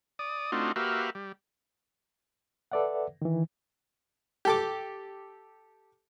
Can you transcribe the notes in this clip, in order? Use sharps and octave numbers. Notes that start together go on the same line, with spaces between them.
D5 D#6
A3 C4 D4 D#4 F4 F#4
A#3 F#4 G4 B4 E5 F5
G3
A4 B4 D5 E5 F#5
D#3 E3
G4 A4 D6